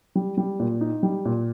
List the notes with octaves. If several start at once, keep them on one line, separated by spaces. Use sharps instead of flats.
G3
G3
A#2
D#4
G3
A#2